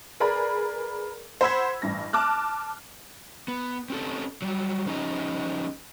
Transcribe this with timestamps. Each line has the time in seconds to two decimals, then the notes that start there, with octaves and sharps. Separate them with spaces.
0.20 G#4 A#4 B4 D5 B5
1.41 C5 F#5 B5 E6 G#6 B6
1.82 A1 G2 A#6
2.13 A5 D6 F6 F#6
3.48 B3
3.90 C4 C#4 G4 A4
4.42 F#3 G3
4.86 F3 C#4 D#4 G4 D#5